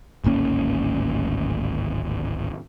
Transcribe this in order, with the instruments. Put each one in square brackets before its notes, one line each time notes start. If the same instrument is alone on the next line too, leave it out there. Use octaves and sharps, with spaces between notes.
[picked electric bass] D1 G#1 A#3 C#4